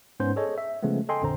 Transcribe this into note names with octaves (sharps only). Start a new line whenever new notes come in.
G#2 B3 C#4 C5 G6
G#4 A4 C#5 D#5
E5
C#3 F3 G#3 A3 B3
A4 D#5 G5 G#5 C6
A#1 F2 D3 C5 A#5